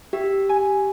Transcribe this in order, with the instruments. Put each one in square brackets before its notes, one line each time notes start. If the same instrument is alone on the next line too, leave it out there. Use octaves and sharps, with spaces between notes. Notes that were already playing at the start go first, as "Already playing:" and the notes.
[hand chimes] G4 [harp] E5
[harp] G#5